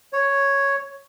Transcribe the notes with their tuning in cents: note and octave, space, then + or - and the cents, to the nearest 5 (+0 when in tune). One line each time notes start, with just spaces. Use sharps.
C#5 +0